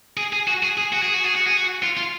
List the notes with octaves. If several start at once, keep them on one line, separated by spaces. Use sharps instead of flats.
G#4
G#4
F#4
G#4
G#4
F#4
G#4
F#4
G#4
F#4
G#4
F#4
F4
F4